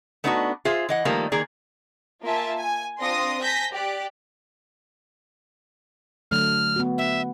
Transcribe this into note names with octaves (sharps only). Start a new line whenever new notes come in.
A3 B3 D4 D#4 F4 F#4
F4 G#4 C5 E5
E3 D#5 F#5
D#3 F3 G3 A3 A#3
D#3 A#3 G#4 D5
A#3 F4 E5 G#5 A5
G#5
C4 D4 F4 C6 D#6 A#6
G#5 A5 G6 A#6 B6
G4 D5 F#6
D3 F#3 A3 F6
B3 F#4
E5 F#5